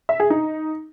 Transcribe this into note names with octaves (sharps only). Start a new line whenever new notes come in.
E5
G#4
D#4